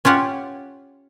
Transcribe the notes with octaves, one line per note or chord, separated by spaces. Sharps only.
C#4 F4 G4 F#5